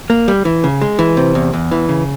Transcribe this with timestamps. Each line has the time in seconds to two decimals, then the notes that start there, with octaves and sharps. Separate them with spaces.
0.10 A#3
0.28 G3
0.45 E3
0.64 C#3
0.82 G#3
0.99 E3
1.17 C3
1.35 E2
1.53 E2
1.71 E3
1.89 C#3